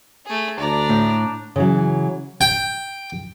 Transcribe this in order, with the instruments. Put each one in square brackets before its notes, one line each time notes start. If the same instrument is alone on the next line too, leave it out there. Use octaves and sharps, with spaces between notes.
[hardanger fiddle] A3 G#4
[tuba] D2 [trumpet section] D4 [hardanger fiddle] D5 A#5
[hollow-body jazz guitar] A2
[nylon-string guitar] C#3 E3 F#3
[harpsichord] G5